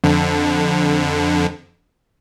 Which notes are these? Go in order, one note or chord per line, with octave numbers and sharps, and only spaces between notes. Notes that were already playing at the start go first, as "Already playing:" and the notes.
F2 D3